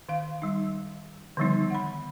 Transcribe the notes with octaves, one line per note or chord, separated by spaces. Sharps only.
D#3 F5
G3 D#4
D3 D#3 F3 G3 B3 D#4
F#5 B5